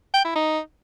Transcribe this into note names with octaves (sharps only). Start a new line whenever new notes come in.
G5
E4
D#4